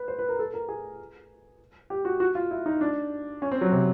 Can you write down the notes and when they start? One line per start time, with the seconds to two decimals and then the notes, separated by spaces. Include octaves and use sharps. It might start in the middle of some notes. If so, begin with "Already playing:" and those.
Already playing: B4
0.08 C5
0.19 B4
0.29 A#4
0.39 A4
0.54 A#4
0.69 G#4
1.90 G4
2.05 F#4
2.20 F#4
2.35 F4
2.51 E4
2.66 D#4
2.81 D4
3.42 C#4
3.51 C4
3.61 F#3
3.72 C3